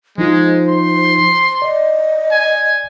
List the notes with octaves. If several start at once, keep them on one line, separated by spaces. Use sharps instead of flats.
F3 G#3 D#4 F4 C5
C6
D5 D#5
G#5